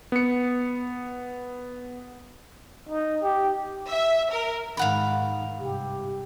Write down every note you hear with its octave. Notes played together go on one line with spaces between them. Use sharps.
B3 C#7
D#4
G4
E5
A#4
G#2 D#3 F5 F#5 B5
G2 C3 G4